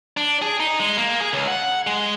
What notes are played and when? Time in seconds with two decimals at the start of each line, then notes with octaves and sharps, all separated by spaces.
0.17 D4
0.42 G#4
0.60 D#4
0.80 G#3
0.97 A#3
1.20 G#4
1.33 C#2
1.48 F#5
1.87 G#3